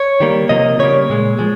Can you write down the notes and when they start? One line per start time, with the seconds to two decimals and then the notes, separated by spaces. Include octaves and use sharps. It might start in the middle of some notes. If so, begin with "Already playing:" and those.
Already playing: C#5
0.20 D#3 G3 A#3
0.49 C3 F3 A#3 D#5
0.79 C#3 G3 A#3 C#5
1.10 A#2 G#3
1.39 F3 G#3